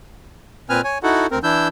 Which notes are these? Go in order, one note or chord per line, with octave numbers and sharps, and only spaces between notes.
A#2 C4 B4 G#5 F6
C#5 G#5
D#4 E4 F#4 A4 F#5
D2 C4 A#4
E3 D4 E4 E6 G6